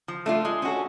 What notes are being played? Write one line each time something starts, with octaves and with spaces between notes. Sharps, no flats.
F3
A3 D4 F4
G#3
C#4 F#4 A4